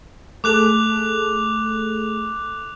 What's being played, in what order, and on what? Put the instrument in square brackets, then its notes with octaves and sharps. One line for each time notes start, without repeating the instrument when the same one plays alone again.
[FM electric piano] A3 G#4 A4 [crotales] D6 F#6 F7